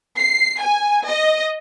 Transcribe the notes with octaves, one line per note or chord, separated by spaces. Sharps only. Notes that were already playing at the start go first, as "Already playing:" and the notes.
C7
G#5
D#5